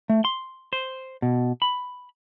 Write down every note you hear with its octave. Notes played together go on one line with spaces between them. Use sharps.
A3
C6
C5
B2
B5